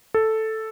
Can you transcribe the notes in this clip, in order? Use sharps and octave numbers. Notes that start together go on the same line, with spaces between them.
A4